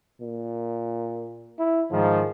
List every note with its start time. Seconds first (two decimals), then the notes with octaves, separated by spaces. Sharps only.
0.21 A#2
1.59 E4
1.91 G#2 D#3 F3 G#3